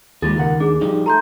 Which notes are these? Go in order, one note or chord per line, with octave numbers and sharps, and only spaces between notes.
D#2 G#3 F4 G#4 A6
C#2 A#4 F#5
D4 G#4
F3 G3 D#4
A3 A#5 C6 G6